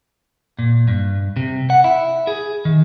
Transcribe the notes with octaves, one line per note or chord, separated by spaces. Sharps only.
A#2
G2
C3
F#5
E4
G#4
D#3